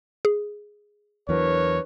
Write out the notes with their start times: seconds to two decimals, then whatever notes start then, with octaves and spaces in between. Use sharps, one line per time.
0.25 G#4
1.29 E2 E3 F#3 D4 A#4 B4 C#5